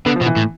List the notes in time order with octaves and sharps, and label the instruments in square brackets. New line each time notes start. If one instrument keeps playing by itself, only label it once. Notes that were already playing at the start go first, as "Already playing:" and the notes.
[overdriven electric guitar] D3 [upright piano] B3
[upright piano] F3
[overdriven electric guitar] B2
[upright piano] E3
[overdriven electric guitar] A2